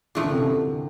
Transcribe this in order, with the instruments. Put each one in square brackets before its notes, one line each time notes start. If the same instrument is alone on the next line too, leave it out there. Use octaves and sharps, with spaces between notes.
[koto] A#2 F3 A3 D4 [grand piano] E3
[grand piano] D3
C3
D3